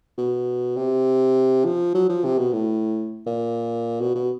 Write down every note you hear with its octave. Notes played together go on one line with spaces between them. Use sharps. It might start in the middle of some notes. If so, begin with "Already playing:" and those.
B2
C3
F3
F#3
F3
C3
B2
A2
A#2
B2
B2